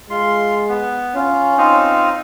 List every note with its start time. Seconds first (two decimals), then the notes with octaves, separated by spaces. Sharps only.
0.10 G#3 F4 C6
0.69 B3
1.15 C#4 F4
1.58 C4 D#4 F4